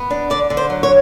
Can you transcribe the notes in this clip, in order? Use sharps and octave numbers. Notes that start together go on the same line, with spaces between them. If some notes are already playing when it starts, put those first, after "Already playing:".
Already playing: B3
D4
D3 D5
D3
C5
F#3
C#5